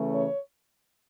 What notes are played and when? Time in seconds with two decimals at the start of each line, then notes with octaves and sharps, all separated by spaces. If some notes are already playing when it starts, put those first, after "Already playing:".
Already playing: C#3 E3 A3 C#4
0.14 C#5